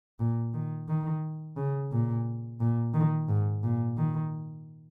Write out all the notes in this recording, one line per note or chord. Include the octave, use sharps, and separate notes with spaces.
A#2
D#3
D#3
C#3
A#2
A#2
D#3
G#2
A#2
D#3